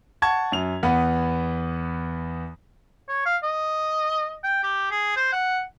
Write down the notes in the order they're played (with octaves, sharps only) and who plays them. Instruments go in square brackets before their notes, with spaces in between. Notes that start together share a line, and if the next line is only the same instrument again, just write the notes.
[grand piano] F#5 A5 C#6 G#6
F#2 F7
E2 B3 B4 F#5 B5
[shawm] C#5
F5
D#5
G5
G4
G#4
C5
F#5